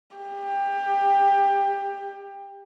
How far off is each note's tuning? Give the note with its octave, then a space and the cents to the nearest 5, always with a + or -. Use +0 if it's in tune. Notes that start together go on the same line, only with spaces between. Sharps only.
G4 +20